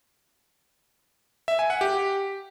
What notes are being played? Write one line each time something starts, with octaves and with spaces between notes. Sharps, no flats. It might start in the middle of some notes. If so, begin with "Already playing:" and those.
E5
G#5
F#5
G4